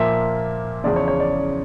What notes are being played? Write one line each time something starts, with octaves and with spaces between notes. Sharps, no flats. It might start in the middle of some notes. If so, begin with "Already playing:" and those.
Already playing: A#2 F3 A#3 E5
E2 C#3 F3 D5
C#5
C#5
D5